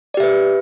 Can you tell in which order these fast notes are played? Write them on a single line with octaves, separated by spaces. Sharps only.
D5 G4 E5 B4